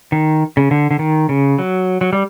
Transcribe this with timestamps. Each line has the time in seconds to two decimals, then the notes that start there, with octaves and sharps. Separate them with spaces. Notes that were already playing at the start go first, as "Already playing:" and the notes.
0.12 D#3
0.57 C#3
0.71 D3
0.91 D3
0.99 D#3
1.29 C#3
1.59 F#3
2.01 F#3
2.13 G3